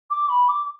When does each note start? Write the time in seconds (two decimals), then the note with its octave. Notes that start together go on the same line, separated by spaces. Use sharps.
0.10 D6
0.28 B5
0.48 D6